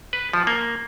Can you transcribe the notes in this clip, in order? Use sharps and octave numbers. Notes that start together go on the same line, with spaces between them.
B4
F3
A#3